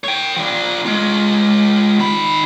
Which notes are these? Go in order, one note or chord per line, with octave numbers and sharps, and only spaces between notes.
C#5 G5
F3 D4
G#3 F4
D#3 B5